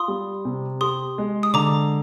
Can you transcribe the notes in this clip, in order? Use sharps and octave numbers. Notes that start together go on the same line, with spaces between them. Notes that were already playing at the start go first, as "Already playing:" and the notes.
Already playing: F4 C6 D#6
G3
C3
G4 C6 D#6
G#3
D#6
D3 A#5 D6